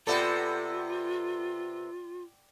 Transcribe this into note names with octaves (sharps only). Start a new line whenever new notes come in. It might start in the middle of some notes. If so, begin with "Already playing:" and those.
C3 B3 F4 A4 D5 F#5 G5